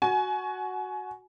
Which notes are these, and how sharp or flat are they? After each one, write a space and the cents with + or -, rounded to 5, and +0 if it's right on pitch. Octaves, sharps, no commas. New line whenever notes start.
F#4 +0 G#5 +30